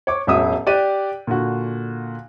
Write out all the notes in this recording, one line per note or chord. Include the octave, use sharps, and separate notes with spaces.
C#5 D6
E1 A1 F#3 E5 D#6
G4 D5 F#6 D#7
A#2 D3 F#4